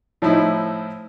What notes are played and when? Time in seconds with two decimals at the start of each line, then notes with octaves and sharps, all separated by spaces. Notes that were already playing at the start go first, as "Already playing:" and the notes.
0.22 A2 F3 D#4 E4